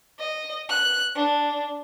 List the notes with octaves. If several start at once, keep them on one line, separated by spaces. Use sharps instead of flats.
D#5
F#6
D4